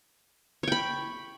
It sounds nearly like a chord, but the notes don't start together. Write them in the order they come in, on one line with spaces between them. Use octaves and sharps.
C#5 G5 B5